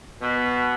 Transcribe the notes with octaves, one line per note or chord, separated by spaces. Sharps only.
B2